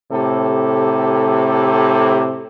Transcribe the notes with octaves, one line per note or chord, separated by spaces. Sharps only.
A2 C3 G4 A4